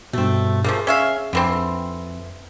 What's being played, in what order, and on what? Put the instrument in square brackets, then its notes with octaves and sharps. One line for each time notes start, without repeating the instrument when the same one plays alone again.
[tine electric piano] G2 B2 [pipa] A3 C4
[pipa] F3 A3 A#3 [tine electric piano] G#4
[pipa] C#4 E5 F5
[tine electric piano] F2 [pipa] D3 E3 C4